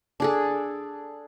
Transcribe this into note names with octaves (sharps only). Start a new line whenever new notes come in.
D4 G#4 A4